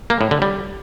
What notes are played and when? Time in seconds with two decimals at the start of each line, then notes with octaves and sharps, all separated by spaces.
0.10 A#3
0.21 A2
0.31 D3
0.42 G3